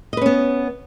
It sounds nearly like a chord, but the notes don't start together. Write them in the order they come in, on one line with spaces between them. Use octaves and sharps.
D#5 B4 C#4 B3